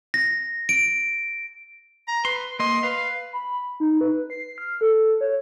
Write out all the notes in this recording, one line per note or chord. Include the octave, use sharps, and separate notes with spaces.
A#6
D7
A#5
B4 C6
A#3 D#5 C6
B4 F5
B5
D#4
B4
C7
F6
A4
C#5